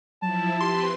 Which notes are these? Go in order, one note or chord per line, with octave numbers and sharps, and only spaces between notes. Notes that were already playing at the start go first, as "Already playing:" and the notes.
F3 F#3 E4 A5
C4 G4 B4 C6